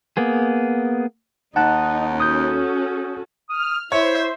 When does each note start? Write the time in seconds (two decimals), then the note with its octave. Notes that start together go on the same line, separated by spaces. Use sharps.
0.17 A#3 B3 G#4
1.56 D#2 D#4 F#5 A5 F#6
2.20 C#4 F#4 A4 D#6 G6
3.49 D#6 F6
3.92 E4 C5 C#5 E5